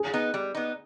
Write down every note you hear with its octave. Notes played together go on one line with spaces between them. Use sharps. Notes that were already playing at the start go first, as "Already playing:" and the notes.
Already playing: G#4
B3 D#4
G3
B3 D#4